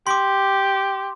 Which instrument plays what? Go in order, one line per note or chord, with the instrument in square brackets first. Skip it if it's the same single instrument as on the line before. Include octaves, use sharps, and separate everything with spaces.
[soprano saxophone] G4 [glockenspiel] C6 D6